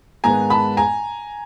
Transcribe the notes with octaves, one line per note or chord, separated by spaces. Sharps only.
G#2 D#3 G#3 B3 G#5 A#5
A5 B5
G#5 A#5